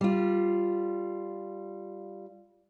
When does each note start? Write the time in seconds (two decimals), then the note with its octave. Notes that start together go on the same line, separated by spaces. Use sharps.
0.01 G3 F4